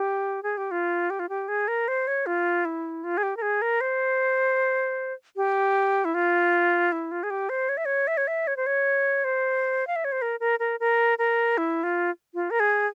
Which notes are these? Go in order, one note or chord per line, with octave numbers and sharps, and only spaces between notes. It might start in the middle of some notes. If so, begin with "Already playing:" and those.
Already playing: G4
G#4
G4
F4
G4
F4
G4
G#4
A#4
C5
C#5
F4
E4
F4
G#4
G4
A#4
G#4
A#4
C5
G4
E4
F4
E4
F4
G#4
G4
C5
C#5
E5
C#5
E5
C#5
E5
C#5
C5
C#5
C5
F5
E5
C#5
C5
A#4
A#4
A#4
A#4
A#4
E4
F4
F4
A#4
G#4